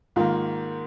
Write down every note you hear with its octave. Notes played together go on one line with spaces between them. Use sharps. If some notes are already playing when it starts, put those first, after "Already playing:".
G#2 D#3 A#3 F4